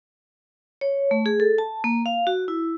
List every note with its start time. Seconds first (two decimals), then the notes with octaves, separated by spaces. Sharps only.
0.81 C#5
1.11 A3
1.26 G#4
1.40 A4
1.58 A5
1.84 A#3
2.06 F5
2.27 F#4
2.48 E4